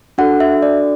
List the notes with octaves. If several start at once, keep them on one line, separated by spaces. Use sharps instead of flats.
D4 F#4 A4 F#5
E5
D5